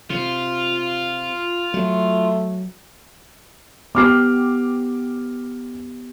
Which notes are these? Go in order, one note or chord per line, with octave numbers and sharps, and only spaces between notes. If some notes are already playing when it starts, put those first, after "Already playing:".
C3 F4
F#3 A3
B3 G4 D6 F6 C7